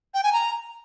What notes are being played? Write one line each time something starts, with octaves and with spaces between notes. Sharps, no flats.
G5
G#5
A#5